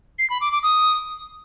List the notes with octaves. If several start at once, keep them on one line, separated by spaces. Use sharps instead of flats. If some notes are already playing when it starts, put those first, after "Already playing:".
C7
B5
D6
D6
D#6